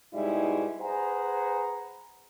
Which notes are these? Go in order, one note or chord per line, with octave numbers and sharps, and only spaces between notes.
G#2 B2 G3 G#3 D#4 E4
G#4 B4 C5 F#5 G#5 A#5